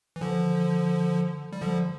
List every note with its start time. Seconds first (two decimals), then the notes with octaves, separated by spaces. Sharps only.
0.16 E3
0.21 D3 F3
1.53 G3
1.61 D3 F3